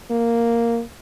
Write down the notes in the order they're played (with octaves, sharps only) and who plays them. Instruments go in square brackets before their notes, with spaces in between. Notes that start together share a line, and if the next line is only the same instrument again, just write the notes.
[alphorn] A#3